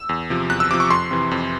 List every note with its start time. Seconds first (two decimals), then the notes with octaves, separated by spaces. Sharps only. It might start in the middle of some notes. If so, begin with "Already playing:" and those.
Already playing: E6
0.09 E2
0.30 C3 F3
0.50 E2 F#6
0.60 E6
0.70 C3 F3 D6
0.80 C#6
0.90 F2 C6
1.11 C3 E3
1.31 F2